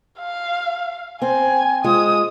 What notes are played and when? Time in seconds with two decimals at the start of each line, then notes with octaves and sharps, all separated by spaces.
0.20 F5
1.22 C4 G#5
1.84 G#3 F4 D#6